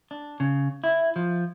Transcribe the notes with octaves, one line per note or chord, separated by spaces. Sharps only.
D4
C#3
E4
F3